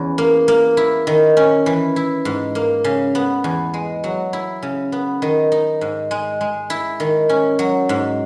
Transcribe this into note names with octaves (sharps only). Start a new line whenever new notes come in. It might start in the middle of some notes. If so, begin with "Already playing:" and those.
Already playing: E2 C#4
A#3
A#3
E4
D#3
C#4
E3
E4
G#2
A#3
C#3
B3
E2
G#3
F#3
E4
C#3
B3
D#3
D#4
G#2
G#3
G#3
E4
D#3
C#4
F#3
G#2